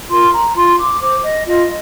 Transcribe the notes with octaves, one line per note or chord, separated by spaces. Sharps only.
F4 A#4 C6
A#5
F4 C6
D6
C5 D6
D#5
F4 D#5